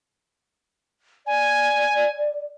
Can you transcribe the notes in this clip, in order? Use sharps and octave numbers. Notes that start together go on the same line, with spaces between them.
D5 G#5